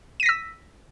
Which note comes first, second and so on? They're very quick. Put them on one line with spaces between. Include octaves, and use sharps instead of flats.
D#7 A#6 B6 E6